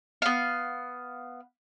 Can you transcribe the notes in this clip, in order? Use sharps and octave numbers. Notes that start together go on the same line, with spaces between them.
B3 F5